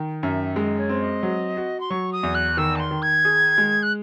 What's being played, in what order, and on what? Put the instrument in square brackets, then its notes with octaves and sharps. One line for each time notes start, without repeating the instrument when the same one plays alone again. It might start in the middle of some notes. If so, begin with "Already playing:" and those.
Already playing: [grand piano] D#3
[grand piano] F#2 [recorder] E5
[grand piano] G#3 [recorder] D#5
[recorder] C#5
[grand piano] C4
[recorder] D#5
[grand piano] F#3
F#4
[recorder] C6
[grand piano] F#3 [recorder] C#6
[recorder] D#6
[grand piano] E2
[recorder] F#6
[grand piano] D#3 [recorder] E6
[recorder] A5
C6
[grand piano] D#3
[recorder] G#6
[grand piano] G#4
G#3
[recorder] F#6